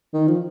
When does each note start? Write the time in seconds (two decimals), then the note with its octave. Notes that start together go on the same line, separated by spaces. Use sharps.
0.14 D#3
0.28 F3